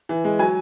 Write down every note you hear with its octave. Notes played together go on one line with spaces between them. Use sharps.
E3
G#3
F#3 G#5